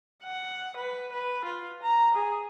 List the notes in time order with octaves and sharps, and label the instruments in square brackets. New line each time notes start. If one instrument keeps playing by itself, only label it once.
[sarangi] F#5
B4
B4
F4
A#5
G#4